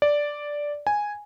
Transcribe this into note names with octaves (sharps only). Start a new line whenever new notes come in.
D5
G#5